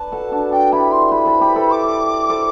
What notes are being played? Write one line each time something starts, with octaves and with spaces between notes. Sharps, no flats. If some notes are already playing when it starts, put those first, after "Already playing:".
Already playing: B4 D5 A5
F#4 A4
D4 F#4
D4 F#4 G5
E4 G4 B5
C6
G4 B4 B5
A4 C5
G4 B4
A4 C5
D6
A4 C5